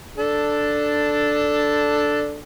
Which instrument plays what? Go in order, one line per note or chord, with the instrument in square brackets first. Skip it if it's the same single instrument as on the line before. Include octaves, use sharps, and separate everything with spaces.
[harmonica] D4 A4